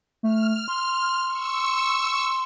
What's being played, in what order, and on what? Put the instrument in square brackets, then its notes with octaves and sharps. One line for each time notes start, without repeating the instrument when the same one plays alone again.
[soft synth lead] A3 [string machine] F6
[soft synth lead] C6
[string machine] C#6 E6